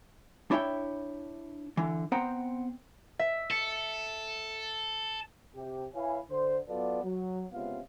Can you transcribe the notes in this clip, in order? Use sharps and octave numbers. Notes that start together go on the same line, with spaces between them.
D4 E4 C#5 E5 G5
D3 E3
B3 C4 C5 F#5 G5 A#5
E5
A4 C#7
C3 G4
E4 B4 C#5 E5 F5 G#5
D3 C5
F#3 B3 F4 A4 B4 D5
F#3
C#2 C3 B3 C#4 F4 F5